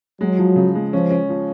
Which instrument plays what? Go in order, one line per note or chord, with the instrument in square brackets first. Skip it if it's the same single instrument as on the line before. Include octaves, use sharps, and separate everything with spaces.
[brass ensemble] F#3 [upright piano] G#3
[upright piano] F3
C#3
G#3
[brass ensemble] F3 [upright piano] C#4
[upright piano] C#4
F3